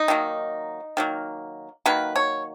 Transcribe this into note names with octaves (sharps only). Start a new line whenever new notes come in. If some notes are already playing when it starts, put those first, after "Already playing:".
Already playing: D#4
D#3 F#3 A#3
D#3 F#3 A#3
D#3 F#3 A#3 B4
C#5